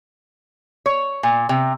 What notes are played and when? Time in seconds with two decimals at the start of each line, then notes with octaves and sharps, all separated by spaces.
0.86 C#5
1.23 A#2
1.49 C3